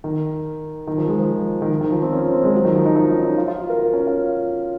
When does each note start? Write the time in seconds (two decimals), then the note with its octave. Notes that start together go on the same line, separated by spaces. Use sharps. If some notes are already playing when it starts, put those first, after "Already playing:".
0.04 D#3
0.87 D#3
0.98 F3
1.08 G#3
1.19 F3
1.62 D#3
1.71 F3
1.81 D#3
1.92 F3
2.02 C4
2.13 C#4
2.22 C4
2.34 C4
2.44 G#3
2.54 F#3
2.65 D#3
2.75 F3
2.86 D#4
2.96 D#4
3.10 C#4
3.24 D#4
3.38 F4
3.48 F4
3.59 F#4
3.69 A#4
3.79 F4
3.93 C#4
4.07 F4